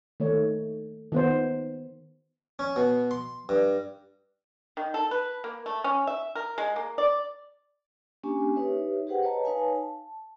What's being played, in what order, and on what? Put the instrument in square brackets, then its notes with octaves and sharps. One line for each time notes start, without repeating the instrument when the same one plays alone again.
[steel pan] D#3 A3 C#5
D#3 B3 C5
[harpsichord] C#4
B2
C6
G2
[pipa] D#3
A4
B4
A#3
A3
C#4
E5
A#4
G#3
A#3
D5
[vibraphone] A#3 C#4 D4 G4 G#5
D#4 G4 B4 C#5 E5
G4 G#4 B4 C5 F#5 G5
B4 C#5 D#5 A5 A#5
D#4 B4 C#5 F5 G#5 A5
A5